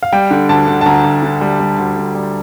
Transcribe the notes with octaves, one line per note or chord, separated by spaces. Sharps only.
F5
G3 G5
D3
D2 A5
D2
A5
D2 A#5
D2
D3
G3
G3
D2
D2
G3